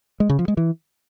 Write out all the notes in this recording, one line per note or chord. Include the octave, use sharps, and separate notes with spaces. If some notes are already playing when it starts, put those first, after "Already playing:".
G#3
C#3
F3
G#3
E3